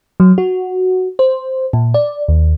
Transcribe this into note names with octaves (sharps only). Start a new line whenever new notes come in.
F#3
F#4
C5
A#2
D5
D#2